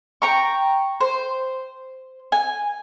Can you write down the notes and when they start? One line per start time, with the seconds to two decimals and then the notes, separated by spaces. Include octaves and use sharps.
0.22 G5 A#5 C#6
1.01 C5
2.32 G#5